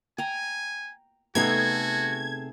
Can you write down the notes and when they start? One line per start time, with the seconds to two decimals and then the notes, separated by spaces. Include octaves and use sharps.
0.18 G5 G#5 A#5
1.35 C3 A3 B3 D#4 F#4 G#4 A4 G#6